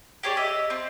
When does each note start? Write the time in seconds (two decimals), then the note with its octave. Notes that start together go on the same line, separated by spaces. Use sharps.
0.23 G4 G#4 C#5 D5
0.37 D#5 E5
0.70 C4